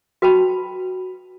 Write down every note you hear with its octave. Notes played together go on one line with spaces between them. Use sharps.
F#4 B4 G5 A5 B5